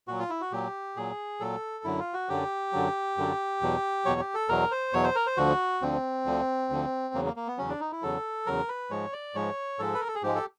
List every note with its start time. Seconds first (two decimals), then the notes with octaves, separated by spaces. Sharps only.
0.08 A#2 F#3 F#4
0.19 F4
0.30 E4
0.41 F#4
0.52 A#2 F#3 G4
0.96 A#2 F#3 G#4
1.40 A#2 F#3 A4
1.84 F#2 D3 F#3 E4
1.99 F4
2.14 F#4
2.29 F#2 D3 F#3 G4
2.73 F#2 D3 F#3
3.17 F#2 D3 F#3
3.61 E2 B2 F#3
4.05 E2 B2 F#3 C#5
4.20 G4
4.34 A4
4.49 E2 B2 F#3 A#4
4.71 C5
4.93 E2 B2 F#3 C#5
5.04 C5
5.15 A#4
5.27 C5
5.37 D2 D3 F3 F#4
5.82 D2 D3 F3 C4
6.26 D2 D3 F3
6.70 D2 D3 F3
7.14 E2 C#3 F#3 A#3
7.25 A#3
7.36 A#3
7.47 B3
7.58 E2 C#3 F#3 C#4
7.69 D4
7.80 D#4
7.92 E4
8.02 E2 C#3 F#3 A4
8.46 E2 C#3 F#3 A#4
8.68 B4
8.90 G#2 F3 G#3 C#5
9.13 D5
9.35 G#2 F3 G#3 C#5
9.79 G#2 F3 G#3 A4
9.94 B4
10.01 A#4
10.08 A4
10.15 G#4
10.23 G#2 F3 G#3 G4
10.35 A4